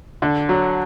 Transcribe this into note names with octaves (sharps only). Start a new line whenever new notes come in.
D3
F#3